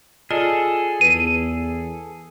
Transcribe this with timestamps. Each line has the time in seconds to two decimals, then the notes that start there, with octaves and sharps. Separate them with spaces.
0.31 F4 G#4 A4 D5 D#5
1.01 E2 B4 D#7